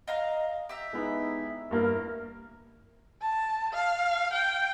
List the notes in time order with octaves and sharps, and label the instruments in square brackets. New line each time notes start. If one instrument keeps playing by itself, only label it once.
[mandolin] D#5 F5 A#5
G4 E5 A#5
[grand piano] G#3 B3 E4 [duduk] D#4
[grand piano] G2 A#3 E4 [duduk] A#4
[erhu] A5
F5
G5